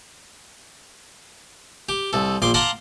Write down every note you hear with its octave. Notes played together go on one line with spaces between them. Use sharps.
G4
C2 A4
A#1 C6 D6
F5 F#5 A5 A#5 C6 D6